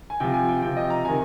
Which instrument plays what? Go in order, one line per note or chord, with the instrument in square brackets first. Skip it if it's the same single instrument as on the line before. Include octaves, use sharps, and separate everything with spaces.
[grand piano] G#5
C3 F3 G5
G#5
G5
C3 F3 G5
D#5
A#5
C3 D#3 G#5